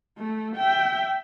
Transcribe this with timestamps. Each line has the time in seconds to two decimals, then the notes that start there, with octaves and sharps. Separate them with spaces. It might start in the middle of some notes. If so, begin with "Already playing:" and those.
0.18 A3
0.56 E5 G5